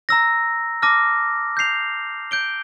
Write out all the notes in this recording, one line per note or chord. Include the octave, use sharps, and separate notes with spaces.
A#5 E6 A#6
A5 D6 F6 A#6
G6 C7 F7
G6 D7 G7